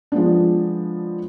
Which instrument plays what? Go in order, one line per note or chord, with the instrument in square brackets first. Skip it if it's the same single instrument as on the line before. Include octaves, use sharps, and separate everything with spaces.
[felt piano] F3 G#3 B3 D4